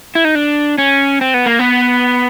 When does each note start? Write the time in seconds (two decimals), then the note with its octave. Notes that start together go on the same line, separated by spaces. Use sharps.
0.15 E4
0.25 D#4
0.35 D4
0.78 C#4
1.21 C4
1.34 B3
1.46 A#3
1.59 B3